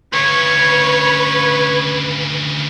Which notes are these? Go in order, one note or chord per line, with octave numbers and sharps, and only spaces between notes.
D2 C#3 B4 C#5